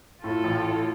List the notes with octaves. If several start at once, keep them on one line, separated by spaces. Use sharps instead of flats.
A2 F4 A4
A1
A2